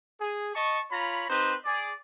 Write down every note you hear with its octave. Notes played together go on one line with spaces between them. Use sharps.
G#4
D#5 A5 C#6
F4 C#5 A#5 B5
C4 D#4 G4 B4 C5
G#4 D5